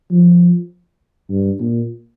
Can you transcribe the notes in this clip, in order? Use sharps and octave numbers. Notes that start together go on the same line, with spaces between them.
F3
G2
A#2